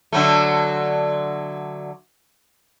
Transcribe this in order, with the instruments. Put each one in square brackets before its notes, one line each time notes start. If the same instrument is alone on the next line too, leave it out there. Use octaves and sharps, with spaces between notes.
[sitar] D3 F#3 A3